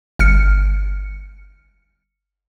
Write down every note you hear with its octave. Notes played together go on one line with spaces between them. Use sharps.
G1 F6 C#7